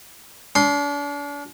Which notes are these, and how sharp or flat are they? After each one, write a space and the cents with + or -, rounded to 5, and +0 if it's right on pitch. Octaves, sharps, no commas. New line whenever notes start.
D4 -40 C6 +0 D#6 +0